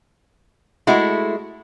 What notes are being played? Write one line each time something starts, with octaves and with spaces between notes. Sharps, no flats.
G#3 A3 E4 F#4